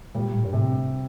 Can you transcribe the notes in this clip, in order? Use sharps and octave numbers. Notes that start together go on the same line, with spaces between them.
A#2 G3
A2
G2
A2 C3